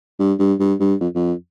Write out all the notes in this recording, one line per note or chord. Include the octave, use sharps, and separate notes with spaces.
G2
G2
G2
G2
F2
F2